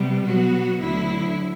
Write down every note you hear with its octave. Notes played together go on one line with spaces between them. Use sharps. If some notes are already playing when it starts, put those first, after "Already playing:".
Already playing: C3 G3 B3
B2 F#3 B3 F#4
D2 D3 F#3 E4